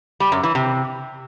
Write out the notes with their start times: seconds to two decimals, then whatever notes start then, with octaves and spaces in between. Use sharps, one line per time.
0.20 G3
0.32 F#2
0.43 E3
0.55 C3